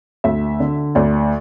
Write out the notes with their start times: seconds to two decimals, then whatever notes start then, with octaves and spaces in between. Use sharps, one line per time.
0.24 D2 E5
0.60 D3
0.95 D2 D5